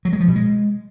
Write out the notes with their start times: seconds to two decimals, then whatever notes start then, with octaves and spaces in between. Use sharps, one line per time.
0.05 F#3
0.13 G#3
0.20 F3
0.28 B2
0.36 G#3